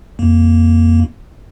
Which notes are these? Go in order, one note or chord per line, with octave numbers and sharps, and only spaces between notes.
F2 A#3